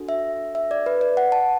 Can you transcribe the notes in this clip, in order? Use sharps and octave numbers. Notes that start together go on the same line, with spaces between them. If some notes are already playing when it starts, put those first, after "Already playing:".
Already playing: D4 F#4 A4
E5
E5
D5
B4
D5
F#5
A5